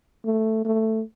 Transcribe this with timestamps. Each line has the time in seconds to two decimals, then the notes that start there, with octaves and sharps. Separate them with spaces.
0.25 A3
0.65 A3